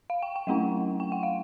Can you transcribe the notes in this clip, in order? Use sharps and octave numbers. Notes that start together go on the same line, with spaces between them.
F5
G5
G5
F#3 A3 C#4 E4 F#5
G5
F#5
F5